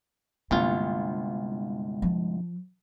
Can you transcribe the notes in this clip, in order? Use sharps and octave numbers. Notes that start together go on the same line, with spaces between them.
G1 C2 G#3 A#3 F4
F3